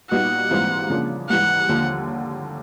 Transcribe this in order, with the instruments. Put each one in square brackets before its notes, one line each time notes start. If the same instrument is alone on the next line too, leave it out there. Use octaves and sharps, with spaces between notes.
[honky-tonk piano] A#2 G3 B3 D#4 F#4 [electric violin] F#5
[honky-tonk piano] G#2 E3 G3 C4 F4
C#3 F3 A#3 D4
[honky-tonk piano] G#2 E3 G3 [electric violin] F#5
[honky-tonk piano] D#2 D3 F3